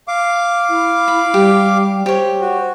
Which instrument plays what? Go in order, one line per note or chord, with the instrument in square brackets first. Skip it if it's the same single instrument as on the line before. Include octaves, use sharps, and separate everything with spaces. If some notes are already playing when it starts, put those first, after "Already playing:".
[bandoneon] F5 D6
[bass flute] E4
[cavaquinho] B5
[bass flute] G3 [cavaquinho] G4
[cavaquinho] G4 C#5 [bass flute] C5
[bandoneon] F#4